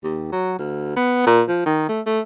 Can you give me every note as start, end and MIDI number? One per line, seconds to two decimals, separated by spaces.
0.04 0.30 39
0.32 0.58 54
0.59 0.97 38
0.97 1.23 59
1.27 1.42 46
1.48 1.64 53
1.66 1.85 51
1.89 2.01 57
2.06 2.20 57